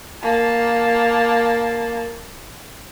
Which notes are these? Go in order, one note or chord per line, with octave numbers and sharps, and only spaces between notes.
A#3 A5